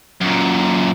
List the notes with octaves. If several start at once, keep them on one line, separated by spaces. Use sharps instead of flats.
F#2 A#2